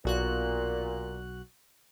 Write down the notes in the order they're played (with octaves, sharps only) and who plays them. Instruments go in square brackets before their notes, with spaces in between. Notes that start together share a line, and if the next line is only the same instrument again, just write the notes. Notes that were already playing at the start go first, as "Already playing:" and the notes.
[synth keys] B1 F#4 F#6 [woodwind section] A#2